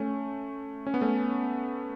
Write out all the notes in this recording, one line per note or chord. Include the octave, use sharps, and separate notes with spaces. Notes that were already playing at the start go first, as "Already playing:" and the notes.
Already playing: A3 C#4
C#4
B3
A3 C#4